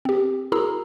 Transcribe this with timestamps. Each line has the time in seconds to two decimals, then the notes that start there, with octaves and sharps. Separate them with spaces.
0.05 C4 G4
0.52 E4 F#4 G#4 A#4 A#5 E6